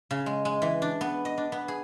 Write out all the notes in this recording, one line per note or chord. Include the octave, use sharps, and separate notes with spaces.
C#3
G#3
G#3
E3
D4
B3
D#5
D4
B3
G#4